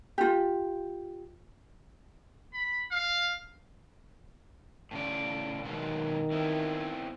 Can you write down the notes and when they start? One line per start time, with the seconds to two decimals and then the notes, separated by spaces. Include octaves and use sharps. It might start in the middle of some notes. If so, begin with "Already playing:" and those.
0.18 F4 G4
2.53 B5
2.91 F5
4.91 A2 C#3 D5
5.64 B2 D#3 F#3 G#3
6.31 B3 C4 E4